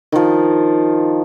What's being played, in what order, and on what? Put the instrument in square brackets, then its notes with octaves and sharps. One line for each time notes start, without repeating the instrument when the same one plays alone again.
[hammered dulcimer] D#3 F3